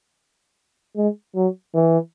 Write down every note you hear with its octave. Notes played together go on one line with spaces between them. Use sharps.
G#3
F#3
E3